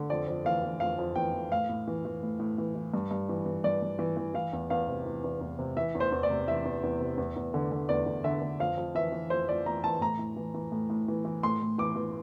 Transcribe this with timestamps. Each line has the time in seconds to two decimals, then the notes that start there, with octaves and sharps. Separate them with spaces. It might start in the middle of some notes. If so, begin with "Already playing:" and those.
Already playing: D3
0.10 F2 D5
0.28 F2
0.45 E3 F5
0.64 E3
0.80 F2 F5
0.98 F2
1.16 E3 G5
1.33 E3
1.51 A2 F5
1.69 A2
1.88 E3
2.05 E3
2.23 A2
2.39 A2
2.58 E3
2.75 E3
2.94 G2
3.11 G2
3.29 E3
3.46 E3
3.64 G2 D5
3.82 G2
3.99 E3
4.17 E3
4.34 E3 F5
4.53 E2
4.70 E2 F5
4.88 C3
5.06 E3
5.24 E2
5.41 E2
5.59 C3
5.77 E3 E5
5.95 E2
6.00 C5
6.12 E2
6.23 D5
6.30 C3
6.48 E3 E5
6.65 E2
6.83 E2
7.01 C3
7.18 E2
7.36 E2
7.54 D3
7.72 D3
7.89 E2 D5
8.06 E2
8.24 D3 E5
8.42 D3
8.59 F2 F5
8.77 F2
8.95 E3 E5
9.12 E3
9.30 F2 C5
9.49 F2 D5
9.66 E3 A#5
9.84 E3 A5
10.01 A2 A#5
10.19 A2
10.37 E3
10.54 E3
10.72 A2
10.90 A2
11.08 E3
11.25 E3
11.43 A2 C6
11.61 A2
11.78 E3 D6
11.96 E3